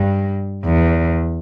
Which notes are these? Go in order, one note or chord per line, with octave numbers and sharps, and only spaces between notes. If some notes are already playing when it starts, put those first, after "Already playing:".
Already playing: G2
E2